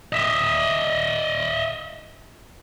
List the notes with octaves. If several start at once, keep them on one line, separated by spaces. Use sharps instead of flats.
D#5 E5